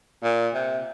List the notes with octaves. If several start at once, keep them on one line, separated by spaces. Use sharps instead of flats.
A#2
C3